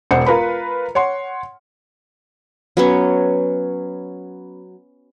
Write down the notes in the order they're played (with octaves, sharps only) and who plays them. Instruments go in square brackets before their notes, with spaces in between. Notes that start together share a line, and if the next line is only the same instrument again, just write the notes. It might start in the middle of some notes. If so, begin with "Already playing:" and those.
[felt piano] E1 C5 F#5 C#7
F4 A#4 B4 B5
C#5 F#5 C6
[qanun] F#3 B3 C#4